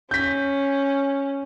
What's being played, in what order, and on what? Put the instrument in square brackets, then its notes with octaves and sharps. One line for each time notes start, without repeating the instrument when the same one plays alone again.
[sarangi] C#4 [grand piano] G6 B6